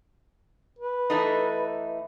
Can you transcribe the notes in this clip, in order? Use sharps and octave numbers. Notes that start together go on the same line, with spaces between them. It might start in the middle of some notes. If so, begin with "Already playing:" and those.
B4
E3 A3 D#4